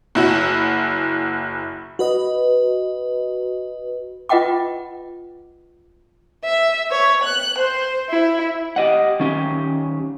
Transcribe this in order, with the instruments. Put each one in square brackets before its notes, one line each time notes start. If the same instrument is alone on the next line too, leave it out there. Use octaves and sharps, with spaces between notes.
[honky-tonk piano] F#1 E4 F#4
[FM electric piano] F#4 B4 D#5
[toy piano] F4 B4 D#5 F#5 G5 D6
[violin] E5
C#5
F#6
C5
E4
[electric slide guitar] G4 D#5 F#5
D#3 C#4 G4